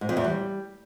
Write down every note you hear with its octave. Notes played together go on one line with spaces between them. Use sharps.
G#2
F2
E2
G3